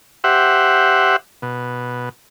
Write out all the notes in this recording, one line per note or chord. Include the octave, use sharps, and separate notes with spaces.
G4 C5 E5 F#5
B2